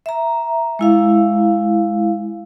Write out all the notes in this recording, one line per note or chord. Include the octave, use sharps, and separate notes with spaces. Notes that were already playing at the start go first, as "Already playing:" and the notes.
E5 A#5
G#3 E4 F5